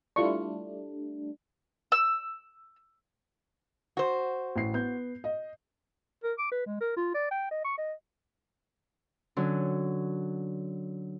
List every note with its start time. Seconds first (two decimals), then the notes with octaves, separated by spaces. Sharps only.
0.16 G3 A3 D4 E4 F4 C#6
1.92 E6
3.97 F#4 C5
4.56 A1 C7
4.74 B3 G6
5.24 D#5
6.24 A#4
6.38 D6
6.52 B4
6.66 G#3
6.80 A#4
6.97 F4
7.14 D5
7.31 G5
7.51 D#5
7.65 C#6
7.78 D#5
9.36 D3 F#3 C#4